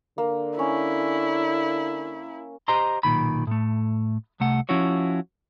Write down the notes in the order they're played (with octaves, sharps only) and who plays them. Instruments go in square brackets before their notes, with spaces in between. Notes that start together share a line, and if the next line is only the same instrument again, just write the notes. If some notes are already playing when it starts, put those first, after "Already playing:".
[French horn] D3 [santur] A#3
[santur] C#4 [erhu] E4
[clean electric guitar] G4 C5 D#5 A#5 C6
B1 A#2 D#3 B5
A2 A3
C2 C3 A3 F#5
F3 C#4 E4 F#4 C#5